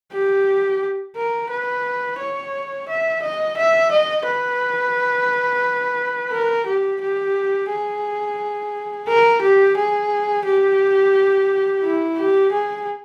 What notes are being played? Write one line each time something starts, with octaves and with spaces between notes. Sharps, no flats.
G4
A#4
B4
C#5
E5
D#5
E5
D#5
B4
A#4
G4
G4
G#4
A#4
G4
G#4
G4
E4
G4
G#4